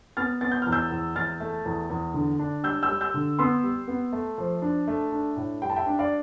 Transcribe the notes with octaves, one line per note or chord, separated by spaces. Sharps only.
B3 F6 A6
B3 A6
G6
E2 F6
E6 G6
E2
E2 F6 A6
A3
E2
E2
D3
D4
G3 E6 G6
E6 G6
G3
E6 G6
D3
B3 C6 E6
G3
B3
A3
F3
D4
A3
D4
A2
G3 G5
A5
E5 G5
D4
D5 F5